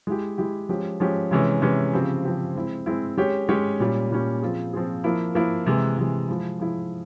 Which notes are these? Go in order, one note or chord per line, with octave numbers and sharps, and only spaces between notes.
G#3 E4 G4
G#3 E4 G4
F3 G#3 C#4 G4
F3 G#3 C#4 G4
C3 E3 G#3 C#4
C3 E3 G#3 C#4
C#3 F3 C4 G4
C#3 F3 C4 G4
G#3 C4 E4
G#3 C4 E4
G#3 C#4 G4 C#5
G#3 C#4 G4 C#5
A#2 G3 C#4
A#2 G3 C#4
F3 C4 F4 G#4
F3 C4 F4 G#4
F3 A#3 E4
F3 A#3 E4
C3 E3 G#3
C3 E3 G#3
F3 G#3 E4
F3 G#3 E4